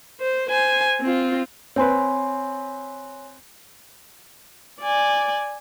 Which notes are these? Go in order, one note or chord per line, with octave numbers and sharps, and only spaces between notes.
C5
C5 G#5
C4 F4
C4 B4 C#5 G#5 C6
D5 G#5